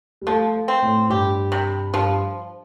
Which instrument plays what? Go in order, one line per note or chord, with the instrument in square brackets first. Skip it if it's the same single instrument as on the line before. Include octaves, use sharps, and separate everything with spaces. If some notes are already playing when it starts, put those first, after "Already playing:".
[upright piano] G3
[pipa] F3 [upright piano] A3
[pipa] C4
[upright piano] A2
[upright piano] G2 [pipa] G4
[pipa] C3
[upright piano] G2 [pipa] F3